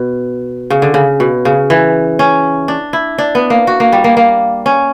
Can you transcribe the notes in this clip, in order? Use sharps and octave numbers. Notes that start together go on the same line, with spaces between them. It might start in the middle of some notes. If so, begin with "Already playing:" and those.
Already playing: B2
C#3
D3
C#3
B2
C#3
E3
C#4
D4
E4
D4
B3
A#3
F#4
A#3
G3
A#3
A#3
C#4